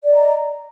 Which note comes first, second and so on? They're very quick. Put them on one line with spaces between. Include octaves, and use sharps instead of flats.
D5 D#5 A#5